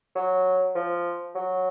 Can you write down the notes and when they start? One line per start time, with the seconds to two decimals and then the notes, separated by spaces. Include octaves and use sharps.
0.15 F#3
0.75 F3
1.35 F#3